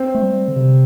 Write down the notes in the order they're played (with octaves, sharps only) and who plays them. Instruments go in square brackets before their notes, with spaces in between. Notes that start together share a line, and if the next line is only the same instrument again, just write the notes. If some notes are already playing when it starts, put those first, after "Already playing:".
Already playing: [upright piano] C4
[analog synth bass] A3
G3
D3
C3